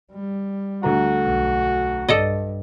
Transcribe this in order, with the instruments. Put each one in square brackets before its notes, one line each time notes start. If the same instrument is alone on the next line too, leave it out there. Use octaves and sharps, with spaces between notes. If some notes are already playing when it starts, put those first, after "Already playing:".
[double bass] G3
[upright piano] D2 A3 A#5 [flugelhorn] F#4
[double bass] B1
[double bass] G2 [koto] A4 D5 D#5